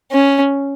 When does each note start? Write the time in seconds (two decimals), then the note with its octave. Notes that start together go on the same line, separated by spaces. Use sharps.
0.12 C#4